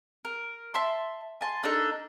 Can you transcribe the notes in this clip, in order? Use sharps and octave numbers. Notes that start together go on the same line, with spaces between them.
A#4
E5 A5 C6
G#5 A5 C6
A#3 D4 D#4 A4